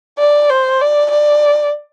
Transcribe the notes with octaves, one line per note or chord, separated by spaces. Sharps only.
D5
C5
D5
D5